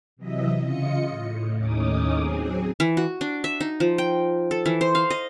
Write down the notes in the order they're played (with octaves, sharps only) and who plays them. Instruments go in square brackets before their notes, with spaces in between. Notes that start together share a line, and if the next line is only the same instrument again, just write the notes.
[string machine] C3 E3 F#3 D#5 E5
C#3 F4 D#5 C#7
A2
D#2 A2 C#4 D#4 D6 D#6
F#3 C4 G#4
[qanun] E3
F#4
D4
E5
D#4
F3
G5
A4
E3
C5
F5
D#5